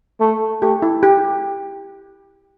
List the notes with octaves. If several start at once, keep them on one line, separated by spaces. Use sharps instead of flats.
A3
A3 G4
E4
G4